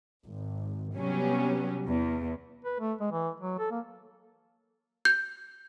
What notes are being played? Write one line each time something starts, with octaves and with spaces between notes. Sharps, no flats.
G#1
C3 F#3 G3 B3 C#4
E2
B4
A3
G#3
E3
F#3
A4
A#3
G6